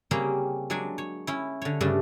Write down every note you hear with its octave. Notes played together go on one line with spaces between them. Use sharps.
C#3 G3 A#3 C4 C#4 G#4
F#3 G#3 D4 G#4 G#5
C#5
C#4 E4
D3 C#5
G2 C#3 A3 D4